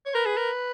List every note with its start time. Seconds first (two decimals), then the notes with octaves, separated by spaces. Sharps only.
0.06 C#5
0.14 A#4 B4
0.26 G#4
0.37 A#4